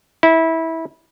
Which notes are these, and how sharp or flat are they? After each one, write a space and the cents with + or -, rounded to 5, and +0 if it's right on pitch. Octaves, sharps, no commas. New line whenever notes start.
E4 -20